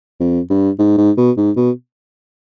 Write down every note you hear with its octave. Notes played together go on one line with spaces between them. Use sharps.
F2
G2
G#2
G#2
B2
G#2
B2